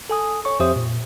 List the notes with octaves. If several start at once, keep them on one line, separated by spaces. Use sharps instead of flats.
A4 G#5 D#6
C#5 C#6
F2 G4 C5 E5 D#6
A#2